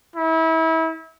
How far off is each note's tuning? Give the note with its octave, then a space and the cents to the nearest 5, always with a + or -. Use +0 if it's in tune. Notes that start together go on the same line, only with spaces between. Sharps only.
E4 -30